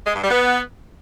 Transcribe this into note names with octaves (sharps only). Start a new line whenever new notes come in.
G#3
G2
G3
B3